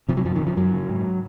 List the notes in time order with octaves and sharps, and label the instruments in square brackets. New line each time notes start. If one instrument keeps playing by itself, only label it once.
[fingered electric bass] C3 F3
F#3
F#2 F3
D#3
C#3
F3
F#2 F#3
C#3
G#2